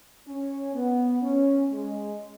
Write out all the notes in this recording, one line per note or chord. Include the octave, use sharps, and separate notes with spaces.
C#4
B3
C#4
G#3